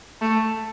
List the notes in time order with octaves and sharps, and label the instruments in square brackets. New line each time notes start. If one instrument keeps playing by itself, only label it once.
[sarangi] A3